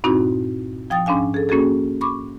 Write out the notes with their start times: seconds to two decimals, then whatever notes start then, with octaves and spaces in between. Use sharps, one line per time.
0.04 G2 A#2 C4 D#4 E4 F#4
0.90 F3 G5 D#6 A6
1.06 G#2 C#4 D4 F5 G#5
1.34 G#4 A4
1.49 A#3 C#4 F#4 G#4 A4
2.01 B5 C#6 D6